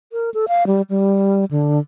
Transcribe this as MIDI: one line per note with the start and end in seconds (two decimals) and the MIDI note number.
0.13 0.30 70
0.34 0.45 69
0.48 0.66 77
0.67 0.82 55
0.90 1.45 55
1.51 1.79 50